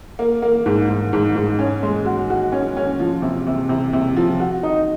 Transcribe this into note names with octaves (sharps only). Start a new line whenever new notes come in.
A#3
A#3
G#2
G#2
G#2
G#2
C#4
G#3
F#4
F#4
C#4
C#4
F3
C3
C3
C3
C3
F3
F#4
D#4